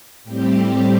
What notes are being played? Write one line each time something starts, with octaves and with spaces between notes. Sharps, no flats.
A2 G3 C4 G4